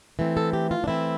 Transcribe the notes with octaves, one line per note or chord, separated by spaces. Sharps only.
E3 A3 C4
A4
G4
F4
D4
E3 A3 C4 E4